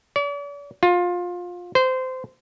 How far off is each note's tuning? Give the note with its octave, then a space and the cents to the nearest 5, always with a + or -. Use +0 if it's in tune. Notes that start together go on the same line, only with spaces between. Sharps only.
D5 -45
F4 +20
C5 -20